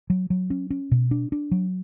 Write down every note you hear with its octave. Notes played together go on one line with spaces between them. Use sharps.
F#3
F#3
C#4
C#4
B2
D4
D4
F#3